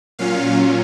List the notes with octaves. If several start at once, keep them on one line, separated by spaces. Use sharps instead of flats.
A#2 F#3 C#4 F4 F5